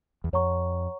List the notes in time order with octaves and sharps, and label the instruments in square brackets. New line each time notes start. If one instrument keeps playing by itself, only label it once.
[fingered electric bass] E2
[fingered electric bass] F2 [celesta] C#5 F#5 A#5 C#6